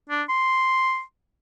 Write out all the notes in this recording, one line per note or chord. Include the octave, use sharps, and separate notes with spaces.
D4
C6